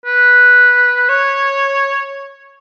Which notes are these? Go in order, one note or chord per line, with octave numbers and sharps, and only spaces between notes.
B4
C#5